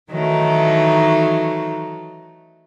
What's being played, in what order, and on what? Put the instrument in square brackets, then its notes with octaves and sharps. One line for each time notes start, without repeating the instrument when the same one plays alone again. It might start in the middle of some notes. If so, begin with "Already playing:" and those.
[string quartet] D#3 E3 F#3 A3 D#4